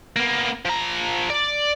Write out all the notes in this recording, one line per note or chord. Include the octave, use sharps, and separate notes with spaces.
A#3 B3
F3 A#5
D5